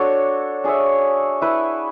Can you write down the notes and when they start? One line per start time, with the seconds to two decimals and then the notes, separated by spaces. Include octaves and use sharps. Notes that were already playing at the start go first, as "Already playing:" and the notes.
Already playing: D4 F#4 A4 C#5
0.64 D4 G#4 C#5 E5
1.41 E4 B4 E5